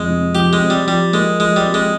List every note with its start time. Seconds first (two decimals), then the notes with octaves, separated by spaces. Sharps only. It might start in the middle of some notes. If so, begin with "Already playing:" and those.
Already playing: F2 G#3
0.10 C3
0.35 F3 G4
0.53 G#3
0.61 C4
0.70 G3
0.87 F3 G3
1.13 G#3 A#3
1.40 F3 G#3
1.56 G3
1.65 C4
1.74 G#3